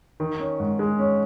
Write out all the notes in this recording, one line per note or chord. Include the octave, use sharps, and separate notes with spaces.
D#3
C#4
G#2
G#3
C#4